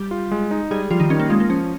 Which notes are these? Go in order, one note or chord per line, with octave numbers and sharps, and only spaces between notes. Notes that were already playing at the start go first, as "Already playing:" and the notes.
Already playing: G3 G4
F4
G#3
D#4
G3 G#3 G#4
F3 G3 F4
D#3 D#4
D#3 C#4
A#3
G#3 F4
A#3
F3 C#4